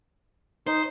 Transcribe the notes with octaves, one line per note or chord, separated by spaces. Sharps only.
D#4 C5